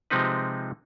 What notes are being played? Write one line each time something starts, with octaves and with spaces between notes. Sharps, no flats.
C3 F3 G#3 C4 D#4 B4